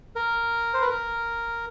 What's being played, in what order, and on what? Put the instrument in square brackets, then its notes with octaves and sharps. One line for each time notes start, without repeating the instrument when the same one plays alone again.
[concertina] A#4
C5
B4
A#4